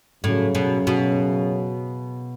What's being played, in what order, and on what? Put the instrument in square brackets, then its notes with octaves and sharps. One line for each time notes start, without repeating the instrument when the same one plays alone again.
[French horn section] F#2 C#3 F#3 [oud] A2
[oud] B2
B2